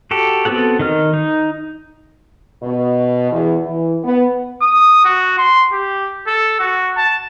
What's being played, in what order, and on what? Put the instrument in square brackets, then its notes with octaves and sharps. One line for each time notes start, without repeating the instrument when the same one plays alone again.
[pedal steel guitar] F#4 G4 A4
B3 C4 F#4 A4 F#5
D#3 D#5 F6
D#4
[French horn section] B2
E2
E3
B3
[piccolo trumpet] D#6
F#4
C6
G4
A4
F#4
A5